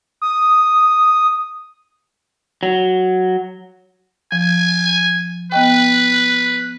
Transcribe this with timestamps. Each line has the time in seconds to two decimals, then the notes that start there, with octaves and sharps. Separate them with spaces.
0.22 D#6
2.63 F#3
4.32 F3 G#5
5.52 B3 B4 D#5 G5